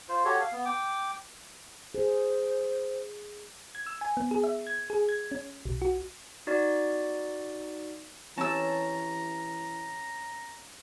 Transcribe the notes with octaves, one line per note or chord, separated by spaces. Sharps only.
F4 C5
F#4 G4 A4 C#5
F5
B3
G5 D6
G#4 C5
G#6
E6
G#5
B3
G#4
E5
G#6
G#4
G#6
C#4
B1
F#4
D#4 F#4 D5
E3 C#4 G4 A5 A#5 E6